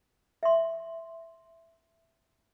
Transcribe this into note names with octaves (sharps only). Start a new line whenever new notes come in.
E5 C6